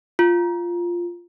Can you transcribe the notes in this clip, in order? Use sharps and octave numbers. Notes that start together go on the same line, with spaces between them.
F4